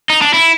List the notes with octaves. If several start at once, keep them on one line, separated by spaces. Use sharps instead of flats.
D#4
D4
E4